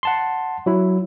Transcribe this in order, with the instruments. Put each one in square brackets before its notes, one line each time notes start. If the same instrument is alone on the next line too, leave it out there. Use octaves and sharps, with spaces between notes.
[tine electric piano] F#5 A5 C6
F#3 E4